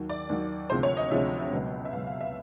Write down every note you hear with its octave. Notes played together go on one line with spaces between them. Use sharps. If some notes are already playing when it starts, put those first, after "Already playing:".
Already playing: D#2 D#3 F#3
D5
D#2 D#3 F#3
D2 C3 F3 G#3 C5
C#5
D#5
D2 C3 F3 G#3 E5
C#2 B2 F#3
E5
C#2 B2 F#3 F5
F5
E5